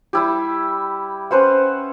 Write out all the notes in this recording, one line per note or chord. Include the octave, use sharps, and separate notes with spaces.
G3 E4 G4
C#4 B4 C5 F#5